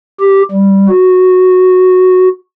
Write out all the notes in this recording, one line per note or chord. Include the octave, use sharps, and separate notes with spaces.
G4
G3
F#4